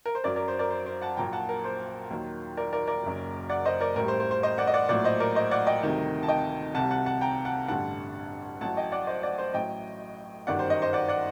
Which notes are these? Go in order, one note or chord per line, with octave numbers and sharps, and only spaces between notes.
A#4
C5
F#2 F#3 A#4 D5
A#4 D5
C5
A#4 D5
C5
C5
F#5 A5
A#1 A#2 F#3 G5 A#5
F#5 A5
A#4
C5
D#2 D#3 F#3
A#4 D5
A#4 D5
A#4 D5
F#1 F#2 F#3
D5 F#5
C5 D#5
A#4 D5
A1 A2 G3 A#4
C5
C5
C5
C5 D#5
D5 F#5
D#5
D5 F#5
A#1 A2 F#3 D5 F#5
C5 D#5
A#4 D5
C5 D#5
D5 F#5
D#5 G5
D2 C3 D#3 G3
A5
D#5 G5
C2 C3 G3 F#5 A5
F#5 A5
F#5 A5
G5 A#5
F#5 A5
A1 G2 D3 G3 F#5 A5
A1 A2 F#3 F#5 A5
D#5 G5
D5 F#5
C5 D#5
D5 F#5
C5
A1 A2 F#3 D#5 G5
G1 F#2 D#3 G3 D5 F#5
C5
C5 D#5
C5 D#5
D5 F#5
D5 F#5